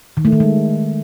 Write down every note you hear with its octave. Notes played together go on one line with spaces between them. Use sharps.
D#3
A3
D#3
G#3